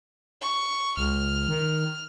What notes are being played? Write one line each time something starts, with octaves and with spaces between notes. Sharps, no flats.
C#6
C#2 F6
D#3